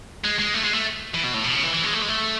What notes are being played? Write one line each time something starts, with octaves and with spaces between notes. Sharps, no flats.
G#3
G#3
A3
G#3
A3
E3
B2
A2
B2
C#3
E3
E3
G#3
A3
G#3
A3